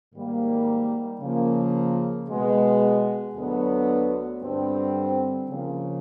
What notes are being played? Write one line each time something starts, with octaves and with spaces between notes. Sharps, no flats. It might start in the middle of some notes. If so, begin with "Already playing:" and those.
G#2 D#3 G3 A#3
C#3 F3 A#3
B2 G#3 B3
D2 D3 F#3 B3
G2 D3 G3 C4
C#3 F3 A#3